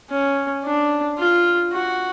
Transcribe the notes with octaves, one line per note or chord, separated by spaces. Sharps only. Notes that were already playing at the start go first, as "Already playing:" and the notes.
C#4
D4
F4
F#4